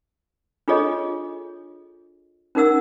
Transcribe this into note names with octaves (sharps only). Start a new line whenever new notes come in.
D4 F4 G#4 A4 C#5 D#5
C#4 D#4 A#4 F#5 E6